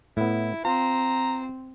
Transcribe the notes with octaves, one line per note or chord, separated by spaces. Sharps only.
A2 B3 E4
C4 F4 A#5